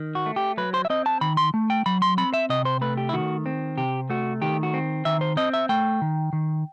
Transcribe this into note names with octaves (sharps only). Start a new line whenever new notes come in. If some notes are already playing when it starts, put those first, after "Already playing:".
Already playing: D#3
F#4
A3
G4
F#3 B4
C5
E5
C4 D#5
A5
D#3 B5
C6
A3
G5
F#3 B5
C6
C4 B5
E5
C3 D#5
C5
A3 B4
G4
E4
D#3 F#4
C4
C3 G4
A3 F#4
D#3 G4
F#4
C4
D#3 E5
C5
C4 D#5
E5
A3 G5
D#3
D#3